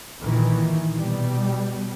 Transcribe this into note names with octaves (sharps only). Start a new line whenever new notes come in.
A#2 D#3 E3
B2 G3